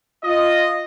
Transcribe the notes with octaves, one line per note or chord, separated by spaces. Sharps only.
F4 D#5